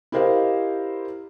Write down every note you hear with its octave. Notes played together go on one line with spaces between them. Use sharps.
E4 G4 A#4 C5 D#5 F5